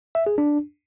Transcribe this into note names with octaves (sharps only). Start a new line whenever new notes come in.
E5
G#4
D4